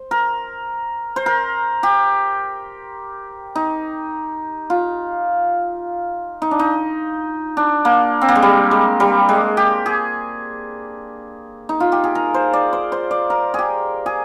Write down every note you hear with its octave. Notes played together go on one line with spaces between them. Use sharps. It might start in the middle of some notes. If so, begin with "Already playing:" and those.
Already playing: C5
A#4
C5
A#4
G4
D#4
F4
D#4
D4
D#4
D4
A#3
C4
A#3
G#3
G3
G#3
G3
G#3
G4
G#4
D#4
F4
G4
G#4
A#4
C5
D5
C5
C5
D5
A#4
G4 G#4
G#4